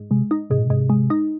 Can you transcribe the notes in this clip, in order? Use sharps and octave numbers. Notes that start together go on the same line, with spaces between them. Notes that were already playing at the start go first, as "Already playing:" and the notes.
Already playing: G#2
C3 G#3
D#4
G#2 C3
A#2
G#2 C3
G#3
D#4